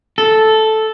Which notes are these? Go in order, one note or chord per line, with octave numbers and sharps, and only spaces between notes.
A4